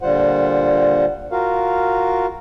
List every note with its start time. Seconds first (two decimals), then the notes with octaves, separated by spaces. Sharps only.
0.01 A#2 D3 G3 F4 C5 F#5
1.31 F4 F#4 A#4 F5